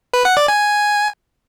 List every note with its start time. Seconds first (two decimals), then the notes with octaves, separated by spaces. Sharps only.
0.14 B4
0.25 F#5
0.37 D5
0.48 G#5